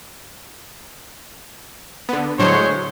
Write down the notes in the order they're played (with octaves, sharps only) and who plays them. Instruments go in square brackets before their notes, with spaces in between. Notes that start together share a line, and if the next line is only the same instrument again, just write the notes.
[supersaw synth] D3 B3
[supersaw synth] A2 D3 F#3 [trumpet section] G#3 C5 C#5